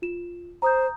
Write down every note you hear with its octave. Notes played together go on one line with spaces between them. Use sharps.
F4 E7
C5 A#5 D#6 G6